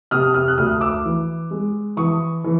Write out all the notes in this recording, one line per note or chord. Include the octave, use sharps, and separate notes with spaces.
C3 D#6 F6
D#6 F6
F#6
D2 D#6 F6
D6 E6
E3
G#3
E3 C#6 D#6
E3